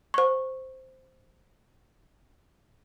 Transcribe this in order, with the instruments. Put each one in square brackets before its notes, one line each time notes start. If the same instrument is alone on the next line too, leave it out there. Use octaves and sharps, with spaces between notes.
[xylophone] C5 C#6